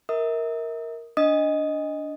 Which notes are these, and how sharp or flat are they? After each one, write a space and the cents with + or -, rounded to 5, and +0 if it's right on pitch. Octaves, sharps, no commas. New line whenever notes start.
A#4 +0 E5 -40 D#6 +0
D4 -15 D#5 +0 D#6 +0